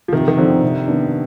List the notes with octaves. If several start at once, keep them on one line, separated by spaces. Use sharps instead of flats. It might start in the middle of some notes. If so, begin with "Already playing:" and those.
F3
C3 D#3
D#3
D3 F3 C4 D#4
C3
D#3 B3 D4